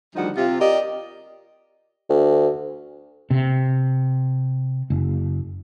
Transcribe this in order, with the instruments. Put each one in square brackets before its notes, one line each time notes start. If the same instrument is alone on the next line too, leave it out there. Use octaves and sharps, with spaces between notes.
[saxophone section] D2 D#3 F3 G3 D#4 F#5
C3 F4
G4 A#4 D5 D#5
[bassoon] D2
[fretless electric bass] C3
F#1